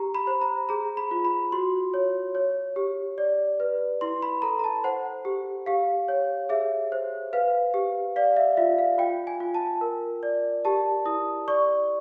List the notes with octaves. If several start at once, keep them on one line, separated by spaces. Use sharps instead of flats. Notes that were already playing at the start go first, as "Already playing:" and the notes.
Already playing: G4 A#5
B5
C5
A#5
G#4 A#5
B5
F4
B5
F#4 C6
C#5
C#5
G4
D5
B4
E4 C6
B5
A4 A#5
A#5
A5
C5 F#5
G4
G4 F5
C#5
G#4 E5
C5
B4 F5
G4
D5 F5
E5
F4 E5
F5
F4 G5
G#5
F4
A5
A#4
D5
G4 A5
E4 D#6
D5 C#6